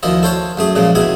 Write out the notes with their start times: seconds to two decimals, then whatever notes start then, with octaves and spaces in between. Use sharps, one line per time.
0.03 D2 D#3 F3 E4 D#5
0.23 A4 C5 C#5 F5
0.57 F#2 A3 G#4
0.75 A#2 C#3 F3 G#3
0.95 C#2 B2 E4 G#4 G#5